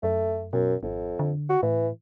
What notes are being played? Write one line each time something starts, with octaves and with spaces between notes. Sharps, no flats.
F#2 A3
F#2 B2
G#1 F2
D3
F#4
A2 E3